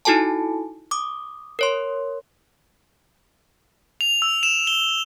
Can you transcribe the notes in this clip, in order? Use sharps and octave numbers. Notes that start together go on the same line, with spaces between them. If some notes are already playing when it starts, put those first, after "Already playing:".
D#4 E4 F#4 A4 G#5 A5
D6 D#6
A#4 C#5 C6
F7
E6
E7
G7